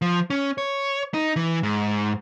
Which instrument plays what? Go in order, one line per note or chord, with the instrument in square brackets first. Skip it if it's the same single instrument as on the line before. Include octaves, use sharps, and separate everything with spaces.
[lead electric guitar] F3
C#4
C#5
D#4
E3
G#2